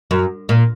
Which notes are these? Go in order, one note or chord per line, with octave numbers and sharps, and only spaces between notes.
F#2
A#2